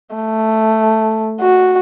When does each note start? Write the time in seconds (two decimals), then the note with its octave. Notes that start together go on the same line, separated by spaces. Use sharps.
0.15 A3
1.41 F#4